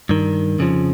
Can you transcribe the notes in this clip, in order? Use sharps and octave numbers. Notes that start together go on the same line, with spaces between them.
G2 D#3
F2 C#3 F3